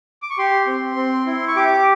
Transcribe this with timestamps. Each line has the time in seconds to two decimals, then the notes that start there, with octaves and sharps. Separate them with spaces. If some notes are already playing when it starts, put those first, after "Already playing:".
0.22 D6
0.30 C#6
0.38 G4 C6
0.67 C4
0.96 C4
1.26 E4
1.48 C#6
1.56 G4 D6